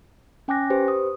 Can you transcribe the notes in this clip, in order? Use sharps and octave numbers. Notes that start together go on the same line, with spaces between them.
C#4 G5 G#5 D6 F#6 A#6
G4 B4 C5
D#6